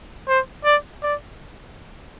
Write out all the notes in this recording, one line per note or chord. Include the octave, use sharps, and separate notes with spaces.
C5
D5
D5